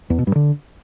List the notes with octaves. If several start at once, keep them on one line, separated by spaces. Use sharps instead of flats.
E2
B2
G2
D3